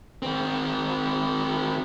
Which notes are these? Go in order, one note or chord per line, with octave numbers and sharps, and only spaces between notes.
D#3 C4